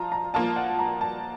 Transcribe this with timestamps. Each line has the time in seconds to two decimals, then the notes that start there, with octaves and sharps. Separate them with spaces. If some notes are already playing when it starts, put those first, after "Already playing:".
Already playing: F3 F4 A5 A#5
0.12 A#5
0.34 F3 A#3 F4 A5
0.56 F#5
0.79 A#5
1.01 A5